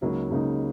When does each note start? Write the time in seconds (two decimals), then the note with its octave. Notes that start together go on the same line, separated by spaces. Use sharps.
0.01 C#2 C#3 F#3 A#3 D#4
0.30 C#2 C#3 F#3 A#3 D#4